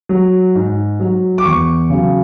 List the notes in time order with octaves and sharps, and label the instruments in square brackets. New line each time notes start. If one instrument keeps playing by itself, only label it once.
[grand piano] F#3
G#2
F#3
D6
E2 C#6
C#3 F#3